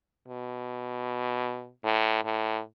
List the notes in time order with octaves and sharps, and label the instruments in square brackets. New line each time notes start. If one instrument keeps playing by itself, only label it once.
[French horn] B2
A2
A2